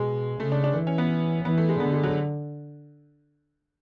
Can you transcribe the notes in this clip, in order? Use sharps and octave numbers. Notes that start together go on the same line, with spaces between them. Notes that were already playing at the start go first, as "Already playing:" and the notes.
Already playing: B2 G#3
C#3 A3
D4
D4
E3
C#4
B3
E3 B3
A3
G#3
D3 B3
G#3
F#3